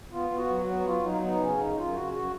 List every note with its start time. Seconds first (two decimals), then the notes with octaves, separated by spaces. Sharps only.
0.11 B3 F4
0.29 B3
0.36 F#4
0.48 F#3
0.61 F#4
0.67 B3
0.84 F#3 F4
1.02 F#3 D#4
1.21 B3 D#4
1.39 C#3 C#4
1.58 F#2 D#4
1.76 F#2 F4
1.94 C#3 F#4
2.13 F#2 F#4